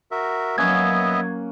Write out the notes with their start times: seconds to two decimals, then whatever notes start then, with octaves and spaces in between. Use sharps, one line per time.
0.11 F#4 A#4 E5
0.58 F#3 A#3 B3 C#4 D#5 E5 F#5 G#6